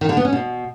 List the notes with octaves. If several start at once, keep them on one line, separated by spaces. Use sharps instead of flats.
D#3
D3
B3
C#4
B2